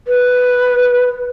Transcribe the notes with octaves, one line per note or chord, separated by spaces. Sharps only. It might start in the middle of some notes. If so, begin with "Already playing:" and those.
B4